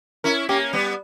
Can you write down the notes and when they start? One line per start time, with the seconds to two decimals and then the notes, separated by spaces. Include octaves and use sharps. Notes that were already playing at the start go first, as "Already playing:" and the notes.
0.24 C#4 E4 A#4
0.49 A#3 C#4 G4
0.73 G3 B3